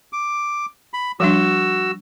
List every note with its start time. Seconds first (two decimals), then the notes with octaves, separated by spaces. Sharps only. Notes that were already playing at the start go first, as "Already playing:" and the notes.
0.13 D6
0.94 B5
1.20 F3 G3 D4 F#4 E6